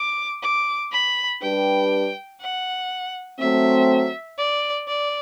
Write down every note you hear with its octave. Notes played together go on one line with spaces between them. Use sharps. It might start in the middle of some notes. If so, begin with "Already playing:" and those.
Already playing: D6
D6
B5
G3 D4 G4 B4 G5
F#5
F#3 A3 C4 E5
D5
D5